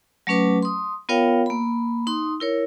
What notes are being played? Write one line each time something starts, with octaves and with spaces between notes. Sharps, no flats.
F#3 A3 C#4 B4 D6
C6 D#6
B3 F4 A#4 C#5 F5 G5
A#3 B5
D#4 C6 D#6
E4 A#4 C#5